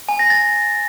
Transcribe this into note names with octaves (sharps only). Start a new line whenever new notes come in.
G#5
A#6
A6